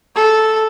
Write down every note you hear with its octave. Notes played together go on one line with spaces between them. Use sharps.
A4